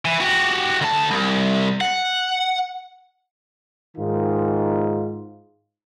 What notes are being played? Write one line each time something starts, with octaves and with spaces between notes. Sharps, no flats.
E3
F#4 G4
D2 A5
C2
F#5
G#2 D#3 D#4 F4